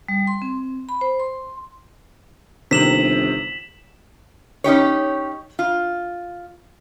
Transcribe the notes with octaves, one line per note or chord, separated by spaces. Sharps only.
G3
C6
C4
B5
C5
C6
G1 C3 D#3 B6 E7 F#7
C#4 D#4 G4 C#5
F4